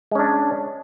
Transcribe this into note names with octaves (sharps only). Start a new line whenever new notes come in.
G#3 C#4 D4